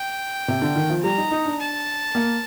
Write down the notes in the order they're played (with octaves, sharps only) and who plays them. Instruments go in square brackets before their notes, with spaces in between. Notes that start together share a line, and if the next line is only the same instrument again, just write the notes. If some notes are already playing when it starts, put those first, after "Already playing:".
Already playing: [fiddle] G5
[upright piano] C3
D3
D#3
F3
[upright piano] G3 [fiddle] A#5
[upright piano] D#4
D#4
D4
[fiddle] A5
[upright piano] A#3